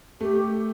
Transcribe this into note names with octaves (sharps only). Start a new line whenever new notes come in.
A3 G4